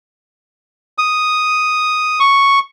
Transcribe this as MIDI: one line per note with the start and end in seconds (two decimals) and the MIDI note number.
0.98 2.19 87
2.20 2.59 85